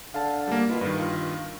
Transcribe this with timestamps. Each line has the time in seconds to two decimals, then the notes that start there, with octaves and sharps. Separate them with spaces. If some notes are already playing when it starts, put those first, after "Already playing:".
0.14 D3 F5 A5
0.48 G3 A#3
0.69 B2 E4 F4
0.81 G2 D#3 B4
0.99 F4